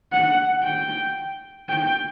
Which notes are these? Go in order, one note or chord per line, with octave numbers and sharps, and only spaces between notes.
F#5
G5
G5